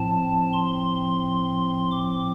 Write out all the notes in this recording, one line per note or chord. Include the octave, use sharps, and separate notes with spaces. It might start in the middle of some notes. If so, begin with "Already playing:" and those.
Already playing: A2 F3 C4 A5
C6
D6